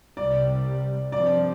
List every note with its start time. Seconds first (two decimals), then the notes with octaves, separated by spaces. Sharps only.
0.17 C2 C3 G3 D5
1.12 G2 F3 C4 D5